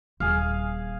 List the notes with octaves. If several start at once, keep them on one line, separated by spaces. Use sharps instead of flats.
D#1 G#4 F5